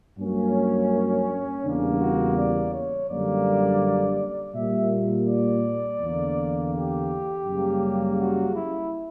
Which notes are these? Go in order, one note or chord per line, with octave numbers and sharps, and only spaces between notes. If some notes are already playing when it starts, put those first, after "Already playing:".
G2 F#3 A#3 C#4
E2 C#3 G3 A#3 D4
F#4
D5
C#5
F#2 D3 G3 A#3 D5
A#2 G3 A#3 E5
D5
E2 D3 A#3
G4
F#2 C#3 G3 A#3
F#4
E4